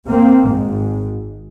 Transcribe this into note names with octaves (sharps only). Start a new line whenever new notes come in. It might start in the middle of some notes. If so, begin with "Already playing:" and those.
A#3 C4
G#1 G#2